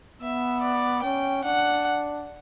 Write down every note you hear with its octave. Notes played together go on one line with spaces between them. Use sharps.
B3 E5
D5
C#4 G5
D4 F#5